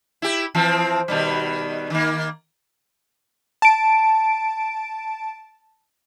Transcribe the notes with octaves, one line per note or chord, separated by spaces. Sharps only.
E4 G4
E3 F3 C4
B2 D#3 G3
D#3 A#3
A5 D7